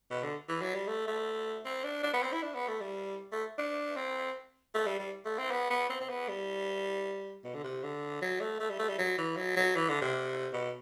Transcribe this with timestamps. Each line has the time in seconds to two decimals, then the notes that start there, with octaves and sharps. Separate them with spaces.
0.10 B2
0.23 D3
0.49 E3
0.62 F#3
0.74 G3
0.88 A3
1.07 A3
1.65 C4
1.84 D4
2.03 D4
2.13 B3
2.23 C4
2.32 E4
2.42 D4
2.55 B3
2.68 A3
2.81 G3
3.32 A3
3.58 D4
3.96 C4
4.74 A3
4.87 G3
4.99 G3
5.25 A3
5.38 C4
5.51 B3
5.70 B3
5.90 C4
6.01 C4
6.09 B3
6.28 G3
7.44 B2
7.54 D3
7.64 C3
7.83 D3
8.22 F#3
8.41 A3
8.60 A3
8.70 G3
8.79 A3
8.89 G3
8.99 F#3
9.18 E3
9.37 F#3
9.56 F#3
9.76 E3
9.89 D3
10.01 C3
10.53 B2